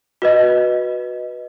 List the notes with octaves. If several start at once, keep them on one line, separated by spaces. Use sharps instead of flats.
F#4 B4 D#5